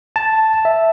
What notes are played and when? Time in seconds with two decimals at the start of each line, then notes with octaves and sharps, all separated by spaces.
0.16 A5
0.65 E5